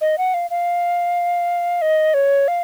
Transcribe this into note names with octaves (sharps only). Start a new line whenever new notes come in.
D#5
F#5
F5
F5
D#5
C#5
F5